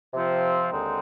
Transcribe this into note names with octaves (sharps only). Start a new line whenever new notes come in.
C3 F3 C4
D#2 D3 G#3 C4 D#4